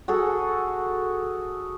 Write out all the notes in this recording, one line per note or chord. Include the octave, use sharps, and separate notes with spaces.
F#4 G#4 A4